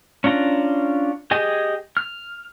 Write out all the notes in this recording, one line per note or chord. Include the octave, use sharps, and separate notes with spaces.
C#4 D4 F4 A#5
G4 G#4 D#5 G#5
F6